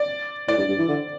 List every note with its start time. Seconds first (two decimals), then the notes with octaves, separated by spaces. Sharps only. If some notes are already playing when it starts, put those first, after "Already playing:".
Already playing: D5
0.48 A2 D5
0.57 G2
0.69 G2
0.78 E3
0.88 D3